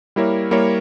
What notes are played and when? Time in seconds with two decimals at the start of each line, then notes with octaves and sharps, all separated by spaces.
0.16 G3 A#3 E4 A#4 C#5
0.51 G3 A#3 E4 A#4 C#5